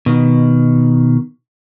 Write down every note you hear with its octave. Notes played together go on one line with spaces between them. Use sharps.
B2 D#3